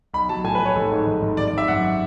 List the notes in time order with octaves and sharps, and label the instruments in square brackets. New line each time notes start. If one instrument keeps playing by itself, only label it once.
[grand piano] B1 B5
F#3 A5
A2 G#5
B4
A2
C#5
G#1 A4
G#2
G#1
G#1
G#1 D5
D5
G#1
E5
F#2 F#5